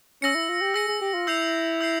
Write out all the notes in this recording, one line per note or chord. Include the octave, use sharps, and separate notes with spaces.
C#4 E6 A#6 C#7
E4
F4
G4
G#4 E6 A#6 C#7
G#4
G4
F4
E4 E6 G6 C7 F7
E6 G6 C7 F7